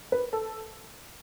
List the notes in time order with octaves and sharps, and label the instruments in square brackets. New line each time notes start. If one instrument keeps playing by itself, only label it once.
[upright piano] B4
A4